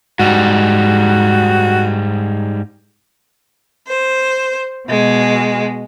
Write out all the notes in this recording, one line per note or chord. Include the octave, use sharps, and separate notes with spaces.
G#2 G3 F#4
C5
B2 G#3